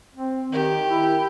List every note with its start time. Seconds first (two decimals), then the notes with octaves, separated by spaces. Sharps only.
0.16 C4
0.52 D#3 G4
0.89 E4